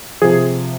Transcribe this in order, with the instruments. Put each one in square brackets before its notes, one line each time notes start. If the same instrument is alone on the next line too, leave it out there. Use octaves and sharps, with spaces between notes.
[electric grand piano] C3 F3 G#4